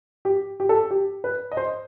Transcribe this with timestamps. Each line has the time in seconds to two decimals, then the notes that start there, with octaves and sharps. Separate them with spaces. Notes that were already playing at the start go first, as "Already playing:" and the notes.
0.25 G4
0.60 G4
0.69 A4
0.91 G4
1.24 B4
1.52 D#5
1.57 C5